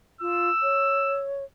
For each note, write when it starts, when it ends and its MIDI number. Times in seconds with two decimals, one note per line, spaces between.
0.21 0.49 65
0.21 1.23 88
0.63 1.44 73